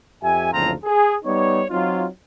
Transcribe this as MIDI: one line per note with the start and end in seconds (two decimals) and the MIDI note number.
0.22 0.52 41
0.22 0.52 67
0.22 0.52 76
0.22 0.52 80
0.53 0.72 30
0.53 0.72 38
0.53 0.72 53
0.53 0.72 60
0.53 0.72 65
0.53 0.72 82
0.84 1.15 68
1.25 1.63 55
1.25 1.63 59
1.25 1.63 63
1.25 1.63 73
1.70 2.06 54
1.70 2.06 60
1.70 2.06 63
1.70 2.06 65